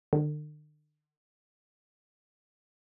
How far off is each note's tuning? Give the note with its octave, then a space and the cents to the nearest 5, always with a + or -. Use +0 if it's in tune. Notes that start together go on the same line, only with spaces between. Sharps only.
D3 +45